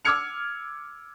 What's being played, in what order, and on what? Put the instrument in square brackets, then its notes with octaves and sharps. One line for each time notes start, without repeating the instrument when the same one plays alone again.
[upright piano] D6 E6 F6 G#6 C#7 F7